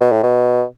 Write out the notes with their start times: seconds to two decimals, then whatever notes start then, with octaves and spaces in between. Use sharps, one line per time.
0.01 B2
0.12 A2
0.23 B2